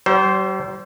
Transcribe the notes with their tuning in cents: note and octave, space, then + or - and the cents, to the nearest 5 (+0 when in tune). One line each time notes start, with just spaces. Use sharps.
G3 -45 C5 +0